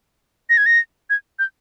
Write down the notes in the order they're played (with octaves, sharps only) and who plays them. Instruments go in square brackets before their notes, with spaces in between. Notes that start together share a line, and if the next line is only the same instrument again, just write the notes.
[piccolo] A#6
G#6
A#6
G#6
G6